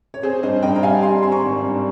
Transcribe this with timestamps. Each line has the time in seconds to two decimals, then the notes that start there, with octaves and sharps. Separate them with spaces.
0.14 C#5
0.23 C4 G#4 C5
0.43 G2 C5 D#5
0.62 G2 D#5 G5
0.76 A#5
0.83 G3 F5 G#5
1.02 G3 G#5 C6
1.22 C4 G#5 C6
1.32 A#5 C#6
1.42 G#1
1.62 G2